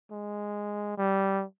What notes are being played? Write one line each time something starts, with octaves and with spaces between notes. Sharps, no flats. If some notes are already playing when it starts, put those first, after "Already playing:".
G#3
G3